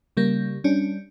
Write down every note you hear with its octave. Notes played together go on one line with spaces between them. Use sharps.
C#3 G3 A#3
G3 C#4 D4